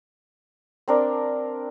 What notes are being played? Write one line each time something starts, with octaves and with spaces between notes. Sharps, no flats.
C4 D4 A#4